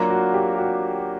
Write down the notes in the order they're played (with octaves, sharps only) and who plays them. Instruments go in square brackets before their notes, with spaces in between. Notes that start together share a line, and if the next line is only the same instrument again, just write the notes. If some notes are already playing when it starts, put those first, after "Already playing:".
Already playing: [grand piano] F#3 A#3 D4 F4 A#4
[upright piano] F#4
G4
F#4